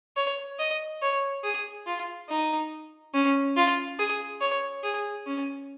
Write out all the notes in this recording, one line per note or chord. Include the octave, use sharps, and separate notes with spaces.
C#5
D#5
C#5
G#4
F4
D#4
C#4
F4
G#4
C#5
G#4
C#4